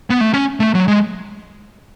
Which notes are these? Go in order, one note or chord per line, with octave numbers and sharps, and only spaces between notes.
B3
A3
C#4
A3
F#3
G#3